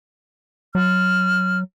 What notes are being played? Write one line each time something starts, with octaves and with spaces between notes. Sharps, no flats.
F#3 F6